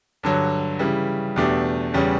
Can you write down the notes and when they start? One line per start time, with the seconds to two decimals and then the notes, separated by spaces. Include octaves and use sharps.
0.23 G2 D3 F#3
0.79 C#3 E3 G3
1.36 E2 B2 A3 D4 G4
1.94 E2 C#3 G3 C#4